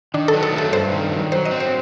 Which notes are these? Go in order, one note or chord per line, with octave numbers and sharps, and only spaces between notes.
D#3 D4
A4
F#3
A4
A3
A4
G2 C5
D#3
F#3
F#3 C5
D#5
C4
C5